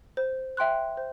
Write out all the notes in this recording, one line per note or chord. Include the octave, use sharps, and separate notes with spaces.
C5
E5 G5 C6 F#6
C5